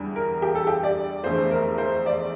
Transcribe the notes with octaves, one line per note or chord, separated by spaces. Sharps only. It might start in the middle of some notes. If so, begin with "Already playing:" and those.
Already playing: E2 D3 G3
A#4
G4
A4
G4
D5
F1 E2 D3 A3 C5
A#4
C5
D5